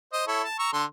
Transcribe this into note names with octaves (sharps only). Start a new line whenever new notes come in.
C5 D#5
E4 A4 C#5
A5
A#5 C#6 E6
D3 A4 C6